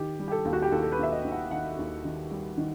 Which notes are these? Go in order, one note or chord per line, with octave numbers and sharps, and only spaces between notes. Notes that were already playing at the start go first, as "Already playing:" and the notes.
Already playing: D#3 G4
G3
G4
A4
D#2
F#4
G4
D#2 A4
A4
B4
D#2 E5
D#5
D#2
F#5
D#3 F#5
D#2
D#3
G3
D#3